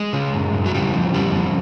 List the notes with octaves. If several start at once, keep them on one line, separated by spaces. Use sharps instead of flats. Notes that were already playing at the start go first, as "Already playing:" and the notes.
Already playing: G#3
C#3
F#2
F#2
F#3
C#3 G3
F2
C#3 G3
F2